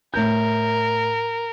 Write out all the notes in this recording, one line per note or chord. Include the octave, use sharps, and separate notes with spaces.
A2 A#4 G6